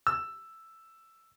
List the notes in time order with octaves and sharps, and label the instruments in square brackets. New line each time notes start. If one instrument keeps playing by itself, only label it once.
[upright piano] E6